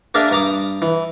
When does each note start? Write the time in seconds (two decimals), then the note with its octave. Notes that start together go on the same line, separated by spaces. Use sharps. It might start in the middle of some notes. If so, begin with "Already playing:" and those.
0.14 A#3 D4 G#4 A#4 E5
0.31 G2 A#5 D6 D#6
0.82 E3